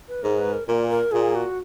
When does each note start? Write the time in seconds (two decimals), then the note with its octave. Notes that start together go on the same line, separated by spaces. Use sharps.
0.09 B4
0.23 G#2 A#4
0.38 B4
0.53 A#4
0.68 A#2 A#4
0.89 A#4
1.12 A#2 G#4
1.35 F#4